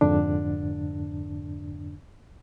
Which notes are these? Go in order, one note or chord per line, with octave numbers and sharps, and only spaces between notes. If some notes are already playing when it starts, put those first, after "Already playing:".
F2 G#2 D3 D4